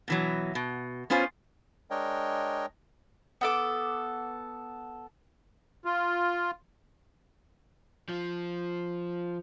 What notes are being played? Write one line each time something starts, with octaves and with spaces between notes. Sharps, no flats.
B2 E3 F#3
B2
B3 C#4 F4 C5 G#5
G#3 D4 A#4 C#5 D#5 G5
B3 A4 D6
F4
F3